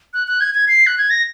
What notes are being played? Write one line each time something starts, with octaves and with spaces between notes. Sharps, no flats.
F#6
F#6
G#6
G#6
C7
F#6
G#6
A#6